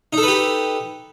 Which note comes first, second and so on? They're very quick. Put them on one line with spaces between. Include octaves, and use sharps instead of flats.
D#4 A4 B4 G4